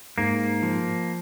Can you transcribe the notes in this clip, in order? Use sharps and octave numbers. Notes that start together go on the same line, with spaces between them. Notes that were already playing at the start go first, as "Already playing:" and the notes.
G#2 A#3
F3